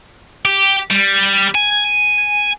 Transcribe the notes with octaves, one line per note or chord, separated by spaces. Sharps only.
G4
G3
G#5